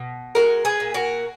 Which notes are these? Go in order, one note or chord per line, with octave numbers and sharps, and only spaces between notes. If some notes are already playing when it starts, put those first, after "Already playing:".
Already playing: B2
G#3 F#4 A#4
G#4 B4
A#2
F#4 A#4